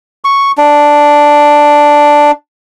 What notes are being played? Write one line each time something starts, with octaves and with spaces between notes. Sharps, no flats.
C#6
D4